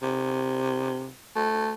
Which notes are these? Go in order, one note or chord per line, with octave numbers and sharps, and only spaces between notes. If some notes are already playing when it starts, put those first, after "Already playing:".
C3
A3